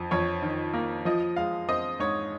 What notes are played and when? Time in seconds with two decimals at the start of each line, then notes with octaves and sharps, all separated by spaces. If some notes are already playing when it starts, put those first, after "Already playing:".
Already playing: F2
0.11 F2 C#5
0.43 D#3
0.74 A#3
1.05 F3 D#5
1.36 G#3 F5
1.69 C4 D#5
1.99 G#2 C#5